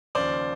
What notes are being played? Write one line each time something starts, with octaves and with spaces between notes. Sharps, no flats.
D#2 C#3 F3 C5 D5